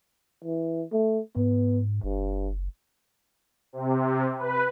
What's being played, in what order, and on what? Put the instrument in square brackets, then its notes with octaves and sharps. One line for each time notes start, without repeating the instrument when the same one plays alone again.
[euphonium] E3
A3
[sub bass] G#2 [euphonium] B3
[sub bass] F#1 [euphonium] G2
[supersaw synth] C3
B4